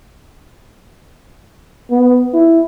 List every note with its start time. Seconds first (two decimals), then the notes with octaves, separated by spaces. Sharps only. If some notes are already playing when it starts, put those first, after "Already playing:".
1.91 B3
2.34 E4